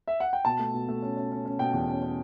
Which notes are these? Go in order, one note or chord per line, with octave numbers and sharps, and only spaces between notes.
E5
F#5
G5
B2 A5
A3
B2
A3
C#4
C#4
C#4
C#4
B2 G5
E2
C#4
C#4